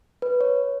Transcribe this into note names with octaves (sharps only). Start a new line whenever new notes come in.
B4
C#5